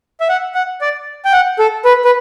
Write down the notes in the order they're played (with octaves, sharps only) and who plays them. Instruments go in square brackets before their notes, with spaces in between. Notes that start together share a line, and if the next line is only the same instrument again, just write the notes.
[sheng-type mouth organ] E5
F#5
F#5
D5
G5
F#5
A4
B4
B4